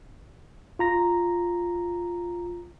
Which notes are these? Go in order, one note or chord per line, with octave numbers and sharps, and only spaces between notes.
F4 A#5 A#6